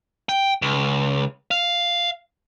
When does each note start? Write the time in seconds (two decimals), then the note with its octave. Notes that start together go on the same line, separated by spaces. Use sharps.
0.29 G5
0.62 C#2
1.51 F5